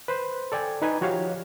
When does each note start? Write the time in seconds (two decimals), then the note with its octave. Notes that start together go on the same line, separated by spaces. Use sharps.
0.08 B4 C5
0.52 A4 D5 G5 G#5
0.82 D#4 B4 G#5
1.01 F3 F#4 G4 C#5 F5